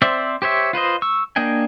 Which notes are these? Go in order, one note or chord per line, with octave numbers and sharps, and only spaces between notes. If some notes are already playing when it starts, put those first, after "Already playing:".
C4 C5 D5 E5
G4 C5 C#5 E5
F4 B4 C5 D#5
C#6 E6
A#3 D4 D#5 G5 G#5